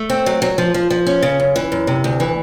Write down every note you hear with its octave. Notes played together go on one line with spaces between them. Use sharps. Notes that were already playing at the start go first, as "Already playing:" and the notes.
Already playing: A3
C4
F#3
F#3
F3
F3
F3
C#4
C#3
F#2
E3
F#2
C3
D2
E3